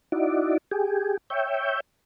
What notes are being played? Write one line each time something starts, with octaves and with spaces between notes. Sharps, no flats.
D#4 E4 F#4 D5
G4 G#4
C#5 E5 G5